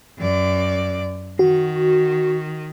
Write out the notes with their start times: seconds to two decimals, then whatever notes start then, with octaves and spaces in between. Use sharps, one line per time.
0.18 F#2 D5
1.39 D#3 F#4